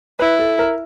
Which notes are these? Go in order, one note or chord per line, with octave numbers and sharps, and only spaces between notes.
E4 B4
A4
A#4